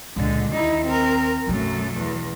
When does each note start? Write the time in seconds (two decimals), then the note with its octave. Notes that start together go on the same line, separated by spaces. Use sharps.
0.16 C#2 A#2 D3 G#3
0.51 D#2 D#4 E4
0.85 C4 A#4
1.47 B1 F#2 F#3 A3
1.98 E2